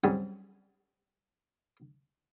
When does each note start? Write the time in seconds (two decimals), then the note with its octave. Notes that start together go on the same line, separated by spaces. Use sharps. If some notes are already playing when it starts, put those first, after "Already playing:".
0.04 G#2 F#3 G3 C4 C#4 G5